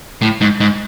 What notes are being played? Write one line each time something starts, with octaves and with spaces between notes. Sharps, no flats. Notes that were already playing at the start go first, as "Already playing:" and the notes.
A2
G#2
G#2